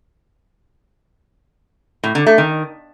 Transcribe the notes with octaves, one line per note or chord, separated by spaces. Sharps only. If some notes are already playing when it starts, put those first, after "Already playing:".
A2
D3
A3
D#3